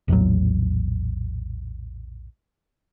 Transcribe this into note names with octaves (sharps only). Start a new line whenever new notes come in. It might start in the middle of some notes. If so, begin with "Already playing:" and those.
A#1 E2 A2 F#3